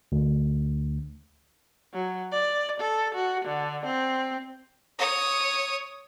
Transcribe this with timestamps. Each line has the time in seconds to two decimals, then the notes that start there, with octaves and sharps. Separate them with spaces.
0.12 D2
1.94 F#3
2.32 D5
2.80 A4
3.15 F#4
3.45 D3
3.86 C4
4.99 C#5 D#6